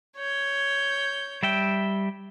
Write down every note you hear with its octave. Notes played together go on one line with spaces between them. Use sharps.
C#5 G6
G3 E5 G5